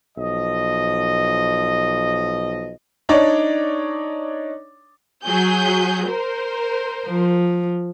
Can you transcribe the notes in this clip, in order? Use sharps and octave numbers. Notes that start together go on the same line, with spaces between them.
B1 F3 D#5
D4 D#4 C#5 D5
F#3 G#4 G6
A#4 C5
F3